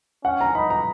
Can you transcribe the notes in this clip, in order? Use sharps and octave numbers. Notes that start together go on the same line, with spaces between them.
C#4 F#5
A#5
D#4 B5
A#5